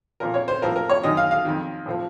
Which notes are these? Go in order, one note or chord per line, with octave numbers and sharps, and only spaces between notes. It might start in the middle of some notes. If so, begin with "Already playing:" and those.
A#2 F3 A#4
C#5
C5
A2 F3 A#4
A#4
C#5
F#2 D#3 D#5
F5
F5
F2 D#3
A2 F3